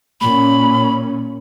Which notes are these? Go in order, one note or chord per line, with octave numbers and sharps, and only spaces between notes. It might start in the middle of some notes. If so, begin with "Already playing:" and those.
A#2 C#4 B5